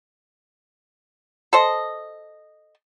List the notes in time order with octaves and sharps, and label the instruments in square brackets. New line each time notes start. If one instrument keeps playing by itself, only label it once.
[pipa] A4 C5 D#5